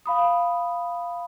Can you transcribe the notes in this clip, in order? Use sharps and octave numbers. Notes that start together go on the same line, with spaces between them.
F5 B5 D#6